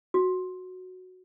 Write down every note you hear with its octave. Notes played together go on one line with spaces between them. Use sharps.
F#4